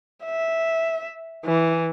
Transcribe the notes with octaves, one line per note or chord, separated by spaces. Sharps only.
E5
E3